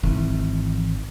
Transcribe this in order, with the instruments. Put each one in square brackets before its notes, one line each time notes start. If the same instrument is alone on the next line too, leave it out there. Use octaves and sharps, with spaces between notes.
[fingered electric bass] G#1 [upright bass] E3